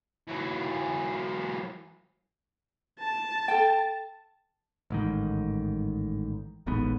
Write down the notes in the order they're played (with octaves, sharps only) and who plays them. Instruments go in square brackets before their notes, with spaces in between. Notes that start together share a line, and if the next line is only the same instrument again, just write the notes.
[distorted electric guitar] E3 F#3
[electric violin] A5
[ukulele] A4 G5
[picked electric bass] A1 G#2 D#3
D#1 A1 G#2 B3